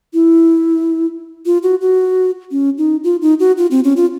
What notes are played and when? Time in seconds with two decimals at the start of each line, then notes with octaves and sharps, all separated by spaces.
0.14 E4
1.46 F4
1.63 F#4
1.81 F#4
2.51 C#4
2.78 D#4
3.04 F4
3.22 D#4
3.40 F#4
3.57 F4
3.71 C4
3.84 C#4
3.96 F4